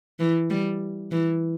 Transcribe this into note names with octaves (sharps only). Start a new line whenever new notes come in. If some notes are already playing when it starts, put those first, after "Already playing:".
E3
G3
E3